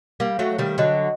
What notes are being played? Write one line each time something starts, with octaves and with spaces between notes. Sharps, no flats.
G3 A#3
F#3 A3
D#3 G3
D3 F#3 D#5